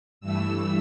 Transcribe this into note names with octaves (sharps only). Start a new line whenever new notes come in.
G2 E3 A3 E6